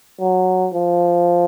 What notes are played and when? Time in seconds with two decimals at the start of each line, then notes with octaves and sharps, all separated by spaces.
0.20 F#3
0.74 F3